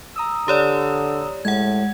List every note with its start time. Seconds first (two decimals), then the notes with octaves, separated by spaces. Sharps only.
0.16 A#5 D#6 E6
0.48 D3 G4 C#5 D5
1.45 A2 G#3 F#5 G#6